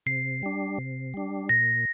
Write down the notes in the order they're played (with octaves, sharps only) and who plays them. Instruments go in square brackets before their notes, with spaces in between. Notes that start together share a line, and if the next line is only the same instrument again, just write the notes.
[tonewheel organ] C3 [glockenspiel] C7
[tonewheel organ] G3 D4
C3
G3 D4
[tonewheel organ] A#2 [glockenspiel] A#6